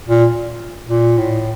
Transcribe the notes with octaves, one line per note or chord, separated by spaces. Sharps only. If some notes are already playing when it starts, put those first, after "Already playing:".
A#2
A#2
A2